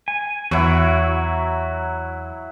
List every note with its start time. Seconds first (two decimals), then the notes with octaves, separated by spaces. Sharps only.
0.08 G#5
0.51 E2 F#3 E4 F#4